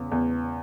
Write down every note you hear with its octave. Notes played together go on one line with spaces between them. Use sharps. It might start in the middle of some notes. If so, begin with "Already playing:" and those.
Already playing: E2 C#3
E2